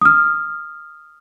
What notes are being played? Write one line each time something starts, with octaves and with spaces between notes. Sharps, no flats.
D#6
F6